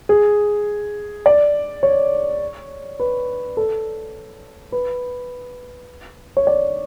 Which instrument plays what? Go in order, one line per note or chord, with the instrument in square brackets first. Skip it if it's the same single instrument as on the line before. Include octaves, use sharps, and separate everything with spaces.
[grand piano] G#4
D5
C#5
B4
A4
B4
C#5
D5